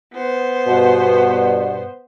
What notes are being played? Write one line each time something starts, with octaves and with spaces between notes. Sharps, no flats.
B3 C5
G2 B2